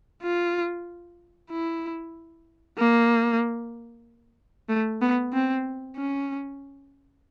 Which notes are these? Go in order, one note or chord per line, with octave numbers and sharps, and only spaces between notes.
F4
E4
A#3
A3
B3
C4
C#4